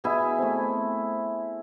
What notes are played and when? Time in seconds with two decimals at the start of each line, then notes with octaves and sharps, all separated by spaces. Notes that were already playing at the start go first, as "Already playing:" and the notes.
0.04 B2 E4 G#4
0.38 A3 C4